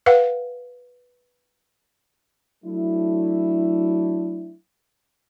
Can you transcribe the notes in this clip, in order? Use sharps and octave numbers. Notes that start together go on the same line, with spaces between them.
B4 F5 F#5
F#3 A3 D4 E4